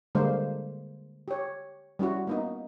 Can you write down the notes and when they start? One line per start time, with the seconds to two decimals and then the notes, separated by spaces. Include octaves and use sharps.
0.15 D3 G3 G#3 A#3 C5
1.28 G4 C#5
1.99 G3 C#4 E4 F#4
2.27 A#3 B3 D#4